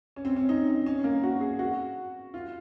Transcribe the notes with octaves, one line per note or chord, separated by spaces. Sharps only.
C#4
C4
C#4
D#4
D#4
C#4
A#3
F#4
G#4
F#4
F4